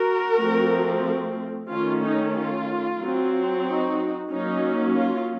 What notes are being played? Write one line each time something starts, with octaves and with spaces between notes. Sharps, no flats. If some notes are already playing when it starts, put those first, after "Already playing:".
Already playing: F#4 A#4
F3 A3 C4
D#3 A3 C#4 F4
D#4
F4
F#3 C4
D#4 F#4
F#3 A#3 C#4 D#4
F4